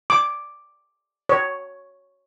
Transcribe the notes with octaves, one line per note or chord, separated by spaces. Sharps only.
D6
C#5